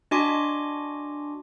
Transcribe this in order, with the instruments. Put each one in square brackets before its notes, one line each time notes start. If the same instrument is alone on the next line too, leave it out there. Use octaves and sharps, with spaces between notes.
[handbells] D4 F#4 D#5 G#5 C6 D6